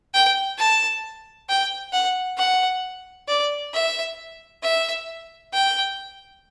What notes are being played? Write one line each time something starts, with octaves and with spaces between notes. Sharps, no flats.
G5
A5
G5
F#5
F#5
D5
E5
E5
G5